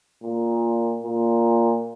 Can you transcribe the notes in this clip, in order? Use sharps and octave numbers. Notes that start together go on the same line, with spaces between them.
A#2
A#2